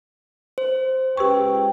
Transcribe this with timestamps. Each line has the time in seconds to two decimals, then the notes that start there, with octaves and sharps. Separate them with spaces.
0.58 C5
1.17 C#2 G4 B4 G5 C#6